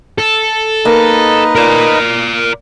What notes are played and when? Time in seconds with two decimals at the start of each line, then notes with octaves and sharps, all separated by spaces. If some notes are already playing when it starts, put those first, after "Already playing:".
0.18 A4
0.85 A#3 D#4 B4 D#5
1.56 A#4 D5